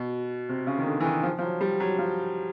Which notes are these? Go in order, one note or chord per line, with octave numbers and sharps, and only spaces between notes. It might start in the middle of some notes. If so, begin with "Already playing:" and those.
Already playing: B2
C3
C#3
D#3
D3
E3
D#3
F3
F3
F#3
G3
F#3
F3